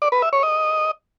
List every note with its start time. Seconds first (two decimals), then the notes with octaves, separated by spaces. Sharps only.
0.02 D5
0.12 B4
0.22 E5
0.33 C#5
0.43 D#5